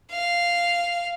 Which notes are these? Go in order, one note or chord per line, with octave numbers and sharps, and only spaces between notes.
F5